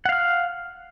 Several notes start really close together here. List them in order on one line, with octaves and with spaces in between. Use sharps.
F#5 F5 F6